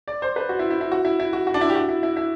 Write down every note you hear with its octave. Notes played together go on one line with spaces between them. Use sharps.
D5
C5
B4
F#4
E4
E4
E4
F#4
E4
E4
F#4
F#4
D4
E4
G4
F#4
E4
E4
E4